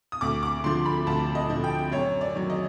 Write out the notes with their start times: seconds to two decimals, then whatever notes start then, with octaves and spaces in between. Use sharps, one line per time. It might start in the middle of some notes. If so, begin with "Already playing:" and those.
0.12 D#6
0.21 D2 D6
0.43 D6
0.64 D3 F3 C6
0.86 B5
1.07 D2 A5
1.35 D#5
1.50 D3 F3
1.64 G5
1.92 F#2 C#5
2.21 D5
2.35 D#3 F#3
2.50 D#5